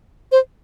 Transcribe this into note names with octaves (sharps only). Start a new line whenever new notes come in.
C5